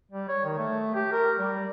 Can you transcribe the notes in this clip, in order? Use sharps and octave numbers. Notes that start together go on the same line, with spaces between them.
G3
C#5
D#3
A3
G4
A#4
G3